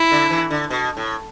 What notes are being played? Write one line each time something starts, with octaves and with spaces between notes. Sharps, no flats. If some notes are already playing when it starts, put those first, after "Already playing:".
Already playing: E4
D3
E3
D3
B2
A2